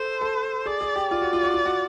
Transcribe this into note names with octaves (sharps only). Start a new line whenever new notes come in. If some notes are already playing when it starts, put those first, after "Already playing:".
Already playing: A4 C5
A4
G#4 D5
G#4
G4
F4 D5
F#4
F4
F#4
F4
F#4